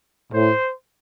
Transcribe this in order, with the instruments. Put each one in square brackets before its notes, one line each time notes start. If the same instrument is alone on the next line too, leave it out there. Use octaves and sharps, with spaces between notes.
[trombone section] A2 [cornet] C5